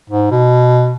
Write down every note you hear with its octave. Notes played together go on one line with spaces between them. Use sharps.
G#2
B2